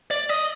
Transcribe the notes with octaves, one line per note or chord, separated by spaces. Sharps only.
D5
D#5